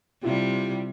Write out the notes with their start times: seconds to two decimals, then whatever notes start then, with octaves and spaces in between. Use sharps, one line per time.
0.23 C3 G3 E4 F4 G4